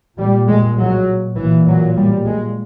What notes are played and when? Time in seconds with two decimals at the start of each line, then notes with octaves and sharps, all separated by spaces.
0.19 A#2 G3
0.48 G#3
0.79 F#3
1.38 A#2 E3
1.67 F#3
1.96 G3
2.26 G#3